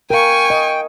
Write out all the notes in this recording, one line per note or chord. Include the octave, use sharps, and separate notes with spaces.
A#4 F5 G5 G#5 C#6
D#5